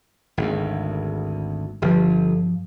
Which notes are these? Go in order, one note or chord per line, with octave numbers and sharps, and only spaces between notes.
G#1 D2
G1 G2 F3